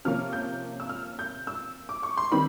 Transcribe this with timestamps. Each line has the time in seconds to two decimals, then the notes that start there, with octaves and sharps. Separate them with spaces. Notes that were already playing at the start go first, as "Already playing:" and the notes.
0.05 C3 F3 A#3 C#4 F6
0.33 G6
0.80 E6
0.89 F6
1.19 G6
1.47 E6
1.89 D6
2.03 C#6
2.17 C6
2.32 D#3 G3 C4 B5